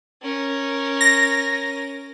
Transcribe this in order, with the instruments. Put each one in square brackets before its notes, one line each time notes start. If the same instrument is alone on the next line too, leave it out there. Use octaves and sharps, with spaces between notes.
[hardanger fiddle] C#4 A#4
[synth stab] A#6